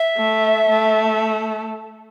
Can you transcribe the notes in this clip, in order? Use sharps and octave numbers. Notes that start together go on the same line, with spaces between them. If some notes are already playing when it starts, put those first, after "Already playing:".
Already playing: E5
A3
A3